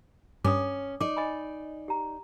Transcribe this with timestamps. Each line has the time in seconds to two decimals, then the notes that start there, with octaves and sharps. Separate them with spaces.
0.44 G2 C#4 D6 D#6
1.01 D#4 D5 D6
1.17 D#5 G#5 B5
1.88 G4 A#5